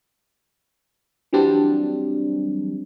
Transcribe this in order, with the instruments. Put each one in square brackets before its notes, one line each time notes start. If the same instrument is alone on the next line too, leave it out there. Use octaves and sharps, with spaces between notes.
[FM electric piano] E3 F#3 G3 C4 D4